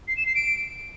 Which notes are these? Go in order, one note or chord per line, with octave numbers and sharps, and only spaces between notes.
C7
E7
C7
D7